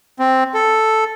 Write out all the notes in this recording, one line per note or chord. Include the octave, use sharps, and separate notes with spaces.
C4
A4